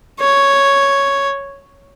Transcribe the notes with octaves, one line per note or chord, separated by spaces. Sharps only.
C#5